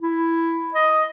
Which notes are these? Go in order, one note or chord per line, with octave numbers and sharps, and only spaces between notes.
E4
D#5